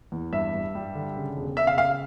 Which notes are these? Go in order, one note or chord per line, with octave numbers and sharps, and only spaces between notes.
E2
G2 E5
G2
G3
D3
C#3
E1
C#3 E5
F5
C#3 F5